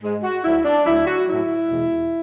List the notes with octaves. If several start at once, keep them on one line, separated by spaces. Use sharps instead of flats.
G#2 G#3
F#4
D2 D3 F#3 E4
D4
D2 D3 F#3 E4
F#4
A2 F#3 E4
E2 B2 G#3